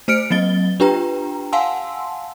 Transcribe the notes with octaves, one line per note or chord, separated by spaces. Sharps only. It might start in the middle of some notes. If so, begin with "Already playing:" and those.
A3 C5 F6 C#7 D7
F#3 A#3 C4 D#5 A6 G7
D4 F4 G4 B4 G5 A#5
F5 F#5 G#5 A5 C6 E6